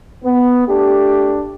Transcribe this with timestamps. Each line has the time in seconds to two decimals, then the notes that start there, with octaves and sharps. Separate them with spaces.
0.23 B3
0.67 A3 D4 G4